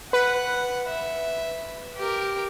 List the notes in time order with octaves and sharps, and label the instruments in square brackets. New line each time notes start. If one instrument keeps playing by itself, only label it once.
[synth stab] B4 [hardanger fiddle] F#5
[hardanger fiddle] E5
G4 A#4